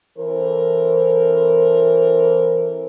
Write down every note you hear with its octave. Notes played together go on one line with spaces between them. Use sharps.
E3 C4 A4 A#4 C5